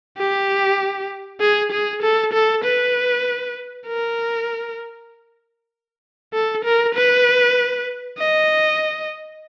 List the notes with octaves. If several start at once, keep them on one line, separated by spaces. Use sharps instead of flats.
G4
G#4
G#4
A4
A4
B4
A#4
A4
A#4
B4
D#5